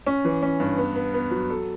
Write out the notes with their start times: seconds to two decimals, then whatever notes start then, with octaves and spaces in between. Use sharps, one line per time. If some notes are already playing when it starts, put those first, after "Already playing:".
0.06 C#4
0.25 E3
0.43 C#4
0.60 G2
0.77 B3
0.95 B3
1.14 B3
1.31 F#3
1.50 A4